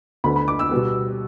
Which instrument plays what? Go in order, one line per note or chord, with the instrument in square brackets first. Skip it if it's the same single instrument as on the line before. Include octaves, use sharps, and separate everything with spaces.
[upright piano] D2 D3 B3 B5
B5
D6
E6
B2 G3 B3